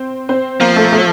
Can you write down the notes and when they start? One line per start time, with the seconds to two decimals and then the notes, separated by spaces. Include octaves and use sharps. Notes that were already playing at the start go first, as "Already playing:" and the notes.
Already playing: C4 C5
0.29 C4 C5
0.60 F3 A#3 A#4
0.76 A3 A4
0.92 A3 A4